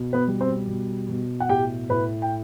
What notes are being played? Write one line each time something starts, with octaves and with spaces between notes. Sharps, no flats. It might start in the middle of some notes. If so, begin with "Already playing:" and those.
Already playing: B2
B3 B4
G3
C4 C5
B2
B2
F#5
A2 G4 G5
A2 B4 B5
G5